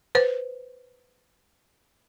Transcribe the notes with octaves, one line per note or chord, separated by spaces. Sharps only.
B4 C5